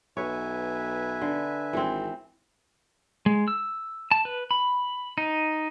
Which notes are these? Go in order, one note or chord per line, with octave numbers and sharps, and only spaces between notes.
B1 B4 C#5 E5 G#5
D3
G#1 E3 C4
G#3
E6
A5
B4
B5
D#4